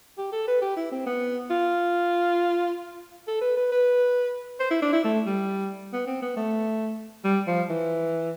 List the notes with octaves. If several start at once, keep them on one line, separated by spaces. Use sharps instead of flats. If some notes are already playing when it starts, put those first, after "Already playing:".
G4
A4
B4
G4
E4
C4
B3
F4
A4
B4
B4
B4
C5
E4
D4
E4
A3
G3
B3
C4
B3
A3
G3
F3
E3